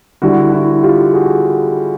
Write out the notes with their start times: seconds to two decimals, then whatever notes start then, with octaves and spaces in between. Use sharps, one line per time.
0.22 D3 G3 E4 F#4
0.52 E4 F#4
0.83 F4 G4
1.14 F#4 G#4